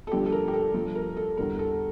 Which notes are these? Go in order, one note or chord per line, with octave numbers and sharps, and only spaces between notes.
A4
G2 D3 F3 G4
A4
A#4
G4
A4
G2 F3 A4
A#4
A4
E2 D3 G3 A#4
A4